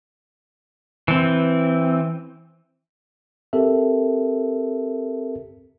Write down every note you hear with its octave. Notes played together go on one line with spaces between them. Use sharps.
E3 C4
C4 G4 A4 A#4 E5